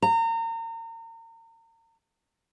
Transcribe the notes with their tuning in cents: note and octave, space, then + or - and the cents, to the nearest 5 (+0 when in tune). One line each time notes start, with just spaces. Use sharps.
A#5 -35